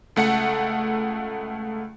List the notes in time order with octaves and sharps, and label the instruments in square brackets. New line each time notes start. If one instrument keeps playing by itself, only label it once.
[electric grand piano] C#2 A3 F#5 C#7